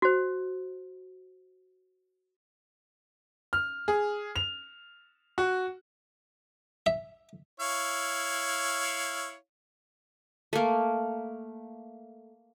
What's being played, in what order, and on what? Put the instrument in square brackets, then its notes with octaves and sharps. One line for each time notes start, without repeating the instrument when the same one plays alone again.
[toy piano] F#4 C5
[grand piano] F6
G#4
F7
F#4
[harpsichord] E5
[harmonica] E4 C#5 F5
[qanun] A3 A#3